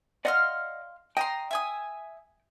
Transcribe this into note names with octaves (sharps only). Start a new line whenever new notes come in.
D5 D#5 F5 F#5 C6 F6
D#5 G5 A#5 C6
E5 G#5 D#6